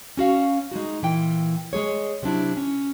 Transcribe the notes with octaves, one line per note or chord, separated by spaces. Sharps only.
C#4 F#4 F5
G#3 D#4 F#4
A#2 E3 G5
G#3 G#4 C#5
C3 F#3 D4 E4
C#4